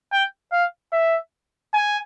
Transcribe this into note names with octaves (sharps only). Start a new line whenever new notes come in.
G5
F5
E5
G#5